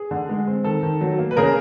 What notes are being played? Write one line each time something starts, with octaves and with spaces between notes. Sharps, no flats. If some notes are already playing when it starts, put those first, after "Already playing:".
Already playing: G#4
D3
G#3
C4
D#3 A4
D#3
F#3
A#3
B4
C#3 G#4 A#4